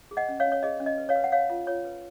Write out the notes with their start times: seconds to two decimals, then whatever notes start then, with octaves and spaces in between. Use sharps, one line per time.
0.11 G#4
0.17 D#5 F#5
0.28 C#4
0.40 C#5 F5
0.46 C#4
0.52 C#5
0.63 G#4 D#5
0.80 C#4
0.86 D#5
0.98 B4
1.09 C#5 F5
1.16 B4
1.24 F#5
1.32 B4 C#5 F5
1.50 F4
1.67 F4 C#5
1.85 B4